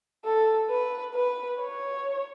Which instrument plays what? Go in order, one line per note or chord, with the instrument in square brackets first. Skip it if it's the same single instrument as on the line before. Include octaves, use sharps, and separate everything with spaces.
[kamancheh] A4
B4
B4
C#5